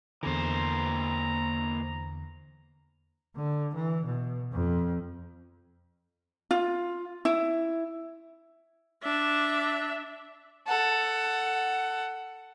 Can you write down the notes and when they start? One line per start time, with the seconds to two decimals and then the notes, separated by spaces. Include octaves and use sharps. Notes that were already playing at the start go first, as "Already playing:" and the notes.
0.23 E2 D3 E3 A#3 C5 A#5
3.36 D3
3.75 E3
4.06 B2
4.53 F2
6.51 F4
7.25 E4
9.03 D4 E5
10.67 A4 F#5